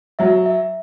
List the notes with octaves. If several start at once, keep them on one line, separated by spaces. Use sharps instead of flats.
F#3 E5
E5